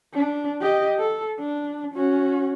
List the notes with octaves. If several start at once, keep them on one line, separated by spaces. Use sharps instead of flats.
D4
G4 D#5
A4
D4
C#4 F#4